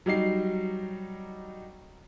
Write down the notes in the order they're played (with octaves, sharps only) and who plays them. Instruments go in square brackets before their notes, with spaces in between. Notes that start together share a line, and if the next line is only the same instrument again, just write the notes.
[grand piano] F#3 G3 D#4 C7